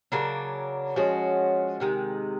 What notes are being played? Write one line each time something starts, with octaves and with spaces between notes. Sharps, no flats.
C#3 F#3 A#3 D4
F3 G#3 C#4 F#4
C3 D#3 G#3